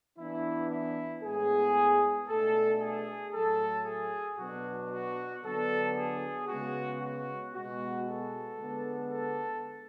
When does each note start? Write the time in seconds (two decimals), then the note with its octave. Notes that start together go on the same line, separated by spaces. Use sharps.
0.18 E3 B3 D4 E4
0.71 E4
1.23 A2 G#3 B3 G#4
2.28 B2 A3 D4 A4
2.81 G#4
3.34 A2 F#3 A3 A4
3.85 G#4
4.38 B2 F#3 B3 D4 F#4
4.91 F#4
5.43 D3 F#3 B3 D4 A4
5.96 G#4
6.48 C#3 G#3 B3 F#4
7.01 F#4
7.54 B2 G#3 B3 F#4
8.06 A4
8.58 D3 G#3 B3 D4
9.12 A4